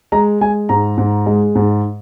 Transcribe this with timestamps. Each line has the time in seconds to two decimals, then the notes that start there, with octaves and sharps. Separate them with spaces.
0.12 G#3 A#5
0.41 G#3 G#5
0.69 G#2 A#5
0.98 G#2
1.26 G#3
1.55 G#2